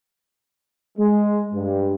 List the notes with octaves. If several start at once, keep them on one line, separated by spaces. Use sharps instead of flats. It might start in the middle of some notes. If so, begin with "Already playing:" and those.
G#3
G2